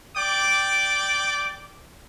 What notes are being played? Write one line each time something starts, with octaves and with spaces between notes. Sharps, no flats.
D5 G5 D6